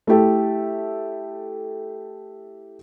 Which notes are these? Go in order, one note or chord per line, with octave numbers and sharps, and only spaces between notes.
A3 E4 G4 A4